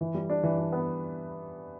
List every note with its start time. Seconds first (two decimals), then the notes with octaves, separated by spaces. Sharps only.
0.01 E3
0.14 G3
0.30 D4
0.43 E3
0.58 D4
0.72 B3